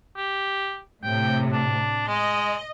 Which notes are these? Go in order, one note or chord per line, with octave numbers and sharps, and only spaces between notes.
G4
A2 C3 G5
D4
G#3 D#5